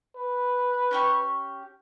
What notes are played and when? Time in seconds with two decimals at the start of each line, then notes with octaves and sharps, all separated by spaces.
0.16 B4
0.91 C#4 G4 C#6